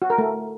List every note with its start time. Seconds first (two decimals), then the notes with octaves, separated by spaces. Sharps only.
0.02 F#4
0.10 A#4
0.18 A3